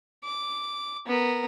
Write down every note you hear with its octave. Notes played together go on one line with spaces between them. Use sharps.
D6
B3 A#4